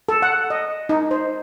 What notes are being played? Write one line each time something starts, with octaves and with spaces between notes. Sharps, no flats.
A4
F#5
D#5
D#4
C5